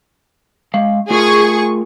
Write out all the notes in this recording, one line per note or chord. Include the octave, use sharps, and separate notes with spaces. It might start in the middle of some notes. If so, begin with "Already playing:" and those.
G#3 F5
A3 F4 G#4 A#4 C#6